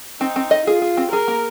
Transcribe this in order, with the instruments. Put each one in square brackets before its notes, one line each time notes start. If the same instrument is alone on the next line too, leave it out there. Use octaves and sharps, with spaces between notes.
[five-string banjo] C4 [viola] D#4
[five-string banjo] C4
D#5
[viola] F4 [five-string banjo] G#4
[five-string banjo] G#4
C4
[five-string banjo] G#4 [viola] A#4
[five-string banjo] A#3